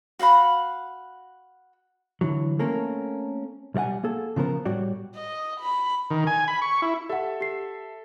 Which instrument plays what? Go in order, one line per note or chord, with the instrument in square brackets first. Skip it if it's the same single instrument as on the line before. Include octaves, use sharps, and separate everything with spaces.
[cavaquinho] F#4 F5 F#5 B5
[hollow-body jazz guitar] D3 E3 F#3
A3 A#3 C4 C#4 A4 A#4
B1 G3 D5 F#5 G#5
A#3 G#4 A4
C#3 F3 B3 A#4 C5
A2 G3 F#4 C#5 D5
[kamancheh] D#5
B5
[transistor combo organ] D#3
G#5
B5
C#6
E4
[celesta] G4 F#5 [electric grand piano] A4 E5
[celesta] G4 C7